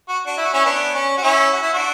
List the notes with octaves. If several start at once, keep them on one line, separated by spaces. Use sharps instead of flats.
F#4
D4 F#4
E4
F#4
C#4 E4
B3 D4
C#4
F#4
C#4 E4
F#4
E4
D4 F#4